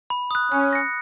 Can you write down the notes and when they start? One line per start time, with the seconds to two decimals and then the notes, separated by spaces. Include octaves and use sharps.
0.10 B5
0.31 D#6 F#6
0.52 C#4 F#6
0.73 A#6 C#7